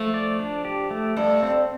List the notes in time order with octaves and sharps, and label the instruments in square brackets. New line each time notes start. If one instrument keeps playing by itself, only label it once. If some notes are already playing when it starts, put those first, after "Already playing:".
Already playing: [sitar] F3 [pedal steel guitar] A3
[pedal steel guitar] D5
D4
G4
A3
[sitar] G2 [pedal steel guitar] A4
[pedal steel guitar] C4